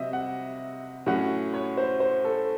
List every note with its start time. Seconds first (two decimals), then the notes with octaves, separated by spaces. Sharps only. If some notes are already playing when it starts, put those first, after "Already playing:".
Already playing: C3 F#3 C4 D#5 E5
0.13 F#5
1.06 A2 F#3 C#4 F#5
1.54 C#5
1.77 C5
2.00 C5
2.25 A4